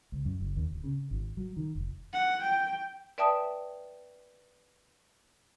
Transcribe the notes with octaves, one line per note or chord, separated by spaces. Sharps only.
C#2
F#2
F#1
D#2
D1
C#3
G#1
F#3
D#3
F1
F#5
G5
B4 D5 E5 G5 A5 D#6